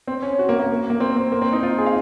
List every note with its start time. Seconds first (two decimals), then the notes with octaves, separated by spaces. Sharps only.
0.07 C4
0.22 C#4
0.39 F#4
0.49 A#3
0.60 A#3
0.90 A#3
1.00 C4
1.17 C4
1.32 A#3
1.42 C4
1.53 D#4
1.63 F4
1.78 G#4
1.86 F5